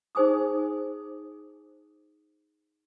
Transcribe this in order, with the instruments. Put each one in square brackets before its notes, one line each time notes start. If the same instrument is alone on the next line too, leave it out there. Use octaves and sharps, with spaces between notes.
[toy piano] D#4 G#4 C5 G#5 D6 D#6